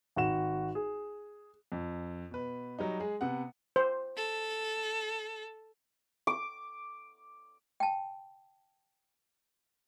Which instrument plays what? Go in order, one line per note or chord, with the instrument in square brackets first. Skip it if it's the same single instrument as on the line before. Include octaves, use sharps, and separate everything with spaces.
[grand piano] G#1 F#4 E7
G#4
F2
B2 B4
F#3 G3 D#4
G#3 G#4
C3 B3 F#5
[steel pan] C5
[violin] A4
[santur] D6
[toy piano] G5 A5